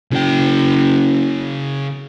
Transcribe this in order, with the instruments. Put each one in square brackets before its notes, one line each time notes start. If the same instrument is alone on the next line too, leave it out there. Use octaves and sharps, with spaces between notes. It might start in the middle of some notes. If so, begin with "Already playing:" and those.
[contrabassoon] F#1 [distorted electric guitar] C#3 G5